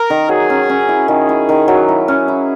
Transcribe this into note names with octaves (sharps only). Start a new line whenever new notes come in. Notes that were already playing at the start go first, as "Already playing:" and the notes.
Already playing: A#4
D#3
F#3 G#4
C#4
C#4
E4
D#3 G#4
E4
D#3
F#3
E4 G#4
C#4
E4